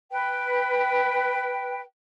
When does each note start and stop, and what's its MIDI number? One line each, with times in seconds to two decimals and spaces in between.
0.11 1.80 71
0.11 1.80 79